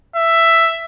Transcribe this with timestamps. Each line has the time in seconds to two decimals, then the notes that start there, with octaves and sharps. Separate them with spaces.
0.16 E5